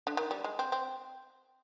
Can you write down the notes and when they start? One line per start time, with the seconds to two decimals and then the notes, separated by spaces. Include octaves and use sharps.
0.07 D3
0.17 D#3
0.31 G3
0.44 G#3
0.59 C4
0.72 C4